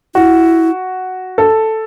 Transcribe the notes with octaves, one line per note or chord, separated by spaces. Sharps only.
E4 F#4
A4